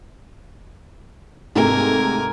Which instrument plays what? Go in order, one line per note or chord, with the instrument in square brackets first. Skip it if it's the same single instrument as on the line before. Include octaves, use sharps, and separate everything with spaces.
[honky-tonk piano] G#2 C3 A3 [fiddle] A#4 G#5